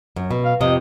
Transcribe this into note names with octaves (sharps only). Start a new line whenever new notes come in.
F#2
B2
F5
F2 C3 D#5